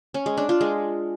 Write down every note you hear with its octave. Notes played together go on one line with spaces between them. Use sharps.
C#4
G#3
D4
F4
G#3